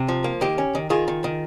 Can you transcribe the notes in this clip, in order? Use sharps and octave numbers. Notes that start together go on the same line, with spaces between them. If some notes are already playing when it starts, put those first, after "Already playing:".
Already playing: C3
F3
A#3
D#3 G4
C#4
D#3
D#3 F4 G#4
D#3
D#3